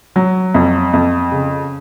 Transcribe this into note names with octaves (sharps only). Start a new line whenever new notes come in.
F#3
F2
F2
C#3